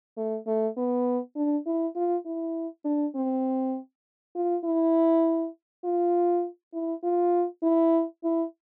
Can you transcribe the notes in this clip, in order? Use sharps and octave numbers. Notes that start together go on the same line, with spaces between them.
A3
A3
B3
D4
E4
F4
E4
D4
C4
F4
E4
F4
E4
F4
E4
E4